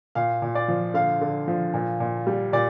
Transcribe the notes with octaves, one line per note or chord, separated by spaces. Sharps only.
A#2 F5
A#2
D5
F3
D3 F5
D3
F3
A#2
A#2
G3
A#2 D5